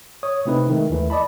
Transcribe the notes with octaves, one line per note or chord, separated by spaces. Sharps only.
C#5 D#6
C3 A3 C4 D#4 E4 B4
D#3 G#3 A3
D#2 E3 A3
D5 D#5 A5 B5